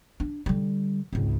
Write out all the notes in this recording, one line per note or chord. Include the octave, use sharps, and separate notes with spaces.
D4
D3 G3
G#1 C#2